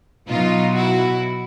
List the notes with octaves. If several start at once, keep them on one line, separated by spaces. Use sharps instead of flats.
B2 F#3 D#4 F4
E4 F#4